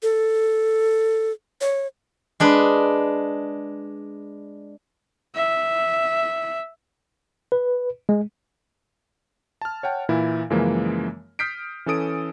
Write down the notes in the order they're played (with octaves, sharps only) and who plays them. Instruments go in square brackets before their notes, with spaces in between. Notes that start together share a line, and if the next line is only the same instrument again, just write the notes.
[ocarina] A4
C#5
[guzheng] G#3 D4 G#4 B4
[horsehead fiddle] E5
[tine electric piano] B4
G#3
[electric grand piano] A5 F6
C#5 F#5 G5 A5
A#2 E3 E4
F#2 C#3 E3 F3 G#3 A#3
D#6 F6 G6 B6 C7 D7
E3 C#4 A4 D#6 D7